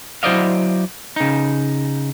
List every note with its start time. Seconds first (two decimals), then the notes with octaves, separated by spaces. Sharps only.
0.23 F#3 E4 C5 D5 D#5 F5
1.16 C#3 D#4